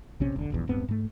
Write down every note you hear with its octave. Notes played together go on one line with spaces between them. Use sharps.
A#1 C3 C#4
E1 D3
D#1 A#1 E2
D1 G2 B3 C4
G#2 A3